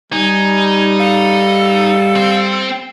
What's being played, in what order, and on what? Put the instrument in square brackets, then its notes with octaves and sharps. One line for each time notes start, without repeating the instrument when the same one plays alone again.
[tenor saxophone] G3 [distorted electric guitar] D#4 [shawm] G#5
[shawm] A4 [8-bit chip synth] F5
[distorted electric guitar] C4